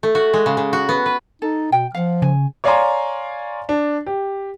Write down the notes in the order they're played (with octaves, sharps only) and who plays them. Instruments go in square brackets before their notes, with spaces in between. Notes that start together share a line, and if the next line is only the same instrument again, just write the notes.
[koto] A3
F#4
G#3
C#3
C#3
F#4
B3
B4
[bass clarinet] D#4 [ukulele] A4
[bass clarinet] B2 [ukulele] G5
[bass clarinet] F3 [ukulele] F5 F#5
[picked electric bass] C#3 [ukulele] G#5
[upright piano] C#5 D5 F5 G#5 A#5 C6
D4
G4